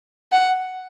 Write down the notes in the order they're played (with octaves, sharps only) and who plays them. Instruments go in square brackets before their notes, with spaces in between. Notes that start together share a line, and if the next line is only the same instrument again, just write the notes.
[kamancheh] F#5